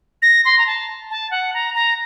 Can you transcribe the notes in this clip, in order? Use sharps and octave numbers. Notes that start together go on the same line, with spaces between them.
A#6
C6
A#5
A5
A5
F#5
A#5
A#5